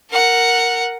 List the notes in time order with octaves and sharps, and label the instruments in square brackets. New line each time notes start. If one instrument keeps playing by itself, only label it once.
[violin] A#4 F#5